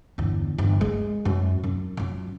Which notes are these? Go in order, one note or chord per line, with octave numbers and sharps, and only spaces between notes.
G1 E2
G1
G#3
F#2
F#2
F#2 F4